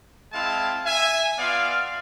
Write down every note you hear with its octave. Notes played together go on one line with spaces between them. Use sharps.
G#3 C4 E4 F5 A5
E5 G#5
B3 F4 D5 F5